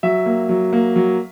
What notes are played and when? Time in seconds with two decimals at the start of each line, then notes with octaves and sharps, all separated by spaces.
0.03 F#3 E5
0.26 A#3
0.49 F#3
0.73 A#3
0.96 F#3